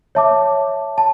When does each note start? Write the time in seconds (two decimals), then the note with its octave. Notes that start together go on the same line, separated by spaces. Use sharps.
0.15 C#5 E5 A5 D6
0.98 A5